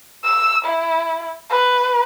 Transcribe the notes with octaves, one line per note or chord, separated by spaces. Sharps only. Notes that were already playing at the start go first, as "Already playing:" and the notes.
E6
E4
B4